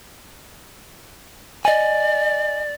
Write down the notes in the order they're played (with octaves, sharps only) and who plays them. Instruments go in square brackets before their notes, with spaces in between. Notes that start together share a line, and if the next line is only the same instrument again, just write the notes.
[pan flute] D5 [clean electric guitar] D#5 G#5